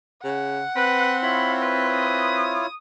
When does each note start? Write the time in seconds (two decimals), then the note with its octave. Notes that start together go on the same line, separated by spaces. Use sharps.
0.24 C#3 F#5
0.76 C4 B4
1.23 E4 F4 C#5 B5
1.62 B4
1.93 D#6